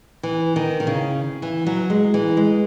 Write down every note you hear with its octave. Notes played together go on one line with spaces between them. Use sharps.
E3
D#3
D#3
C#3
E3
F#3
G#3
E3
G#3